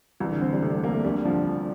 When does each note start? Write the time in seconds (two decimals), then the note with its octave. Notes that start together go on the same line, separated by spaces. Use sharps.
0.20 C2 E3
0.31 D3
0.41 E3 C4
0.52 G3
0.62 C3 A3
0.73 A3
0.84 C2 A#3
0.94 A3
1.04 D2 G3
1.25 D3 F3
1.46 D2